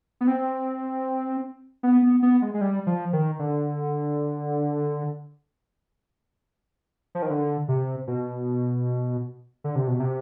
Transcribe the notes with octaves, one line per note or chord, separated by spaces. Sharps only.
B3
C4
B3
B3
B3
G#3
G#3
G3
F3
D#3
D3
F3
D#3
D3
C3
B2
D3
C3
B2
C3